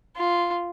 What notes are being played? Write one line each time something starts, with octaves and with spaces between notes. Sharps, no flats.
F4